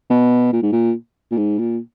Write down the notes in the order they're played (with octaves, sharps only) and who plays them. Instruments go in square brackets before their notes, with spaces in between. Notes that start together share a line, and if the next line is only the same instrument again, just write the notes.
[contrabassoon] B2
A#2
G#2
A#2
A#2
G#2
A#2